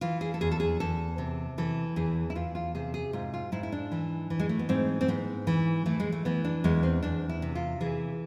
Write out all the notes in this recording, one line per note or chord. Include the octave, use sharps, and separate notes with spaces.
E3 F4
G#4
A4
E2 G#4
A4
G#4
E2 A4
C3
E3 A4
E2 G#4
E4
E2 F4
F4
C3 G#4
G#4
G#2 F4
F4
G#2 E4
E4
D4
E3
E3
G#3
A3
B3
G#2 C4
C4
G#2 B3
E3
E3 A3
G#3
A3
E3 B3
D4
E2 G#3
C4
E2 D4
E4
C3
F4
E3 G#4